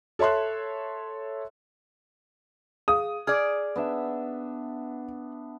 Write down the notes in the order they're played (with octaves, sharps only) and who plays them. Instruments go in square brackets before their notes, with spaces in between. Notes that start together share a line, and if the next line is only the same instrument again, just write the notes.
[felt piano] A4 C#5 E5 C6 F#6
[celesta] G#4 F5 [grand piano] D#6
[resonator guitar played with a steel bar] G#4 D5 [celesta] F6
[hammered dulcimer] B3 D4 E5